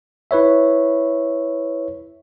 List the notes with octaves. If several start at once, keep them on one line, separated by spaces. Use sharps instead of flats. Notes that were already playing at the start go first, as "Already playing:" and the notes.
E4 B4 C#5 E5